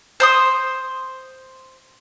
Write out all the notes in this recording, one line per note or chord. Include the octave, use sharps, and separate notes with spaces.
C5 C6 D#6